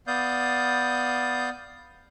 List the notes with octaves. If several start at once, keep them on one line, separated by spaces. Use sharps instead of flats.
B3 D5 F5 D#6 G6